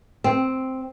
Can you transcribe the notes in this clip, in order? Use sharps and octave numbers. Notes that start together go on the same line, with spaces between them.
C4